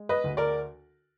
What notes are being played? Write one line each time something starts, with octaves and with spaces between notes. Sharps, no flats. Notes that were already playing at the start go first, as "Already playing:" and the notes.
Already playing: G#3
B4 D#5
D2
A#4 D5